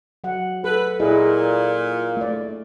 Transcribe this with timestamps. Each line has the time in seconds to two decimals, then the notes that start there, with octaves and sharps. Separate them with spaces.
0.24 F#3 F#5
0.64 A4 B4
1.00 A#2 E4 G#4 D#5
2.17 A3 D5